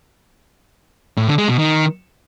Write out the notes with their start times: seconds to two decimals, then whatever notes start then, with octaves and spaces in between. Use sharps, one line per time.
1.17 A2
1.28 D3
1.38 G#3
1.48 B2
1.59 D#3